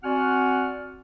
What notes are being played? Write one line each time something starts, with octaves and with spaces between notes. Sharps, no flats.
C4 F#4 D5 F#5 G#5 F6